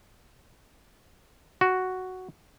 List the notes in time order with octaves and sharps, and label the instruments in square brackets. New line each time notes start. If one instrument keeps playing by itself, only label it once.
[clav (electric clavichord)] F#4